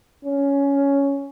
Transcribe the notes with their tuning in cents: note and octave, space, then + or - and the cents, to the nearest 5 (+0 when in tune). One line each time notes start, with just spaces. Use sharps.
C#4 +10